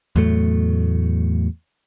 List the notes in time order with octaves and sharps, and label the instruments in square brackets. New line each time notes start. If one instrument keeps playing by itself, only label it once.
[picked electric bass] E2 A2 F#3 A3